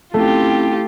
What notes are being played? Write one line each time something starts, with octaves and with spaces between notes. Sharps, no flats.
A3 C4 C#4 E4 F4 G4